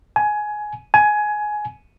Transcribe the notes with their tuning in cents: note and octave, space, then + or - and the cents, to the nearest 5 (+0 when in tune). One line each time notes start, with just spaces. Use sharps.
G#5 +15
G#5 +15